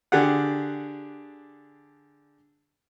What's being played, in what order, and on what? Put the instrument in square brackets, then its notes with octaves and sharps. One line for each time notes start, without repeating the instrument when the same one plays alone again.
[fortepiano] D3 D4 G4 G#4 F#5